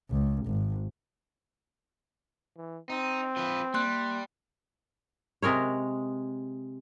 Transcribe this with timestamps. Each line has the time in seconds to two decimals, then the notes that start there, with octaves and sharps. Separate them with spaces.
0.11 C#2
0.46 G#1
2.57 E3
2.90 C4 D#4
3.37 F3 B4
3.74 G3 A#3 C6 F#6
5.42 C3 G#3 A#4 C#5